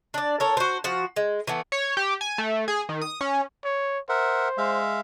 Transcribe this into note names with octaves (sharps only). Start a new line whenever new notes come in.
D4 D5
A4 A#4 C#5
F#4 C5
F3 F#4
G#3
E3 A3 B3
C#5
G4
G#5
A3
G#4
D#3
D#6
C#4
C#5
A#4 C5 E5 F#5
G#3 E5 F5